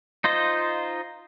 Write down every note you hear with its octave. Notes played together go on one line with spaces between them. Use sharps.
D#4 F4 C5 D#5